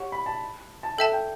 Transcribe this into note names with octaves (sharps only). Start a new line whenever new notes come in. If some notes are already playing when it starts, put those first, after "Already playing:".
Already playing: G4 C#5 F#5 C#6
B5
A5
A5
A4 E5 G5 A5
G5